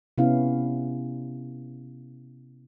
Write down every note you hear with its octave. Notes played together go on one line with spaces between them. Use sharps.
C3 B3 C#4 E4 F5